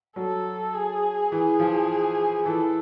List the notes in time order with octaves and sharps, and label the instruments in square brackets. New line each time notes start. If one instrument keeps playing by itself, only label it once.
[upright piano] F#3 [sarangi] A4
[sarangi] G#4
[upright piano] E3 [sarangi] G#4
[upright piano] F3
[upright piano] E3 [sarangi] A4